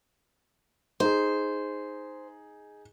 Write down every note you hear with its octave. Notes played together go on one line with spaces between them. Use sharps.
D#4 G#4 C5